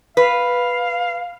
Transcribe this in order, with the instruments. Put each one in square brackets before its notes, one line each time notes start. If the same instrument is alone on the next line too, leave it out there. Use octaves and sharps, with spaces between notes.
[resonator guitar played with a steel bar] B4 [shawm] F5